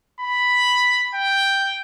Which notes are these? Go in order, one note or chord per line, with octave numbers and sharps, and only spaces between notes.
B5
G5